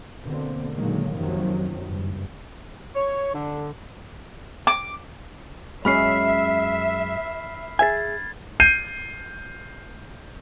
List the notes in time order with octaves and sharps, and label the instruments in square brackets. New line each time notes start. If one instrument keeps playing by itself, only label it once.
[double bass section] B2 D3 A#3 C4
A#2 D3 D#3 F#3 G#3 A#3
F#2 C3 D#3 F3 F#3
F#1 G2
[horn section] C#5
D3
[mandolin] D6
[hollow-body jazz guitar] F#2 G#3 C#4 [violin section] E5 [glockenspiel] B5 F6 C7
[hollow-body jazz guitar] G#4 E5 G#5 [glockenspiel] G#6 A6
[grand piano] G6 C7 D#7